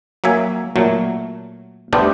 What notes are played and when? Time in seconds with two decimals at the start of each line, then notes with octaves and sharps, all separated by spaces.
0.24 F#3 A#3 E5 G#5
0.76 A#2 F#3 A3
1.93 G3 A3 B3 D4 G4 C5